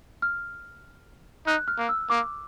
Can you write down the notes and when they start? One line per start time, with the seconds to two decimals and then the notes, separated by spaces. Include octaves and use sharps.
0.22 F6
1.47 D#4 F#6
1.68 F6
1.78 A#3
1.89 E6
2.10 A#3 D6